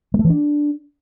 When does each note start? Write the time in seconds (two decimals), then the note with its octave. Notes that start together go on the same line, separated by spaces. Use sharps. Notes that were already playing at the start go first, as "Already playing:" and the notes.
0.14 G#3
0.19 A3
0.25 E3
0.30 D4